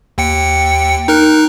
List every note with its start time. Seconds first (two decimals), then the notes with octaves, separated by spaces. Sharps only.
0.18 D#2 G5 C#7
1.08 D#4 A#4 F#6